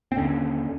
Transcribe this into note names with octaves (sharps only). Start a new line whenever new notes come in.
C4
D#2 D3 C#4